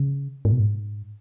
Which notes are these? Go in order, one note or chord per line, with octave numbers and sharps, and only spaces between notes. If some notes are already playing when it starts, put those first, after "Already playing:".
Already playing: C#3
G#2
B2
G#2